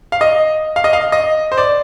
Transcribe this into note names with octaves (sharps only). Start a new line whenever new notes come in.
F5
D#5
F5
D#5
F5
D#5
C5
D5